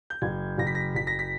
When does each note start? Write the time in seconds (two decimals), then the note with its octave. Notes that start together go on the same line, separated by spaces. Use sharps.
0.10 G6
0.22 F#1 G#6
0.58 F#1 A#6
0.67 B6
0.75 A#6
0.95 F#1 B6
1.07 A#6
1.19 B6